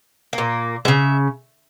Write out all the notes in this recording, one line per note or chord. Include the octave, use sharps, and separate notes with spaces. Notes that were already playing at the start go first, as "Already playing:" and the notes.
A#3
A#2
C#3 G#3 E5